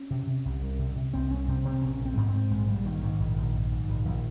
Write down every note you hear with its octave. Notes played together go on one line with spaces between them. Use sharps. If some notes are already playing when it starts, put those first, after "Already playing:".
Already playing: C#4
C3
C3
C2
C2
C3
C3
C2 C4
C2 C#4
C3 C4
C3 C4
A#1 C#4
A#1
C4
G#2
G#2 C4
A#1 G#3
A#1 G3
G#2 D#3
G#2 D#3
A#1
A#1
G#2
G#2
A#1
A#1